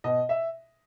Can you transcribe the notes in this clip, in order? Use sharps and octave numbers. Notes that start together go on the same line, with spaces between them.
B2 D#5
E5